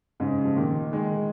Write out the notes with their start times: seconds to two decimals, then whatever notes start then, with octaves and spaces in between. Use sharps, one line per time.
0.20 G#2 C#3
0.45 F3
0.57 A#2 D#3
0.93 D#3 G#3